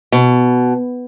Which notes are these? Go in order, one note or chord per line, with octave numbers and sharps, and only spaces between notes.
B2